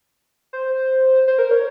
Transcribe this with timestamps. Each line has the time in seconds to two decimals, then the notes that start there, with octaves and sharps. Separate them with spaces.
0.53 C5
1.27 C5
1.39 A#4
1.51 C#5